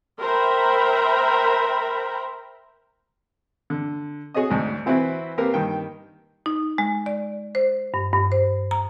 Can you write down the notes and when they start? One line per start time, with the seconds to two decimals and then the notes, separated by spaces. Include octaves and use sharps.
0.20 A#4 C5 E5 G5 A#5 B5
3.70 D3
4.35 F#4 G#4 C#5 D#5 D#6
4.50 D2 G#2
4.86 E3 C4 E4 F#4 B4
5.38 A#3 C4 G4 A#4 B4
5.54 G2 D#3 G5
6.46 D#4
6.78 G#3
7.06 D5
7.55 C5
7.94 G2
8.13 G2
8.32 C5
8.71 A#5